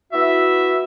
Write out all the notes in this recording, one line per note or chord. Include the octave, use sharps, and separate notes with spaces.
B3 E4 F#4 E5